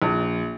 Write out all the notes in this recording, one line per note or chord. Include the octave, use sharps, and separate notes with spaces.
A#1